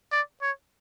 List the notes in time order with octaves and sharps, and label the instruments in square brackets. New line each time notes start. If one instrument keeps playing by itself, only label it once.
[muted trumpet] D5
C#5